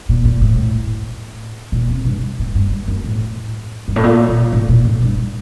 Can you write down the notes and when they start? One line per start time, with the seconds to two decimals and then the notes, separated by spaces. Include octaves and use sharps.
0.09 A#2
0.25 A#2
0.41 A2
1.72 A#2
1.89 C3
2.05 G2
2.39 A2
2.55 G2
2.71 G2
2.88 F#2
3.04 A2
3.88 G2
3.96 A2
4.04 A#2
4.28 A#2
4.53 A2
4.69 A#2
4.85 A2
5.02 G2